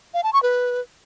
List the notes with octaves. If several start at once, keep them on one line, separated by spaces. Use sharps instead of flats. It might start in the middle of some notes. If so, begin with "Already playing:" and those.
F5
A5
C#6
B4